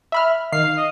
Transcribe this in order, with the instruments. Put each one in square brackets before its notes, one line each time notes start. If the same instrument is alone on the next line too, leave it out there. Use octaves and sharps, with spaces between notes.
[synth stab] E5 B5 F6
[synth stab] D#3 C7 [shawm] F5
[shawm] D#5